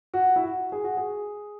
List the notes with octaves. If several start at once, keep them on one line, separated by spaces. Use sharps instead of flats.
F#4
E4
F#4
G#4
F#4
G#4